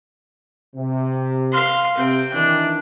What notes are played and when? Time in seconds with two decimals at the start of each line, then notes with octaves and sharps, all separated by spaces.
0.75 C3
1.52 F5 C6
1.97 C3 C4 G5
2.33 D#3 E3 D4